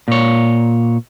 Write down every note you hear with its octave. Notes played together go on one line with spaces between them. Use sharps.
A#2 C#5